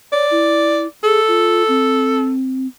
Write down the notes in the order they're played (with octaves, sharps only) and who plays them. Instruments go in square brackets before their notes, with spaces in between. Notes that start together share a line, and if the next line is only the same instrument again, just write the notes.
[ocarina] C#5 [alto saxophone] D5
[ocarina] E4
[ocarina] G#4 [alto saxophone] A4
[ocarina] F4
C4